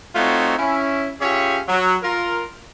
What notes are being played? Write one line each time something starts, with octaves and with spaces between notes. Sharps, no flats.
A3 C4 D#4 F4 F#4 C#5
C#4 E4
C#4 F4 G4 G#4 C#5 E5
F#3
F4 A#4